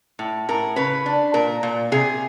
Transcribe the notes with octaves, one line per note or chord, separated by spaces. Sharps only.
A2
A2 A#4
C#3 B4
D4
A#2 A#4
A#2
C3 G#4